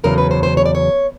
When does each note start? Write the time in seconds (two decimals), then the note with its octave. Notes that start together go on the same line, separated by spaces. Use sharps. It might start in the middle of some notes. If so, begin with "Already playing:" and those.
0.04 E2 C#3 F#3 A#4
0.18 B4
0.31 C5
0.43 C5
0.57 C#5
0.66 D5
0.75 C#5